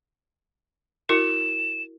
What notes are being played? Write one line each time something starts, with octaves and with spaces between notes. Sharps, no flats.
E4 F#4 A#4 E7